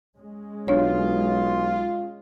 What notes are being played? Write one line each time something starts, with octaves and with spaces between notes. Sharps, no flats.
G#3 C#4
B1 D4 F4 C#5